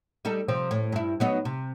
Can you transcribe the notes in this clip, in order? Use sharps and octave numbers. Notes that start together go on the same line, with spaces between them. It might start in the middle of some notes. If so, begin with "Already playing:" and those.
G3 D#4 A4
C3 F3 C4
A2
G2 E4
F#3 B3 D#4
C3